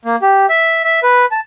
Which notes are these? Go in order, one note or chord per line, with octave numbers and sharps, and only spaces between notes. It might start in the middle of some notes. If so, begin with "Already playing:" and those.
A#3
G4
E5
E5
B4
A5